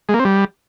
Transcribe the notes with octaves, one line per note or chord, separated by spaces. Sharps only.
G#3
A#3
C4
G3